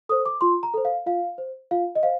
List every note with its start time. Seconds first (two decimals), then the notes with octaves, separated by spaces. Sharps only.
0.09 A4 C5 D#6
0.26 D6
0.41 F4 C6
0.63 A#5
0.74 A4 C5
0.85 F5
1.06 F4 F5
1.38 C5
1.71 F4 F5
1.95 D#5
2.03 C5 F5